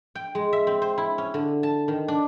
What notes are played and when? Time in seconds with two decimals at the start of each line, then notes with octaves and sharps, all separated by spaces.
0.15 G5
0.35 G#3
0.53 E5
0.67 C4
0.82 C5
0.98 E4
1.18 C#4
1.34 D3
1.63 A5
1.88 D#3
2.08 D4